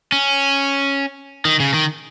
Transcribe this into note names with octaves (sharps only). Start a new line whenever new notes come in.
C#4
D#3
C#3
D#3